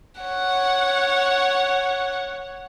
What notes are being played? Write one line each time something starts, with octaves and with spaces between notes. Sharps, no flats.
C#5 F#5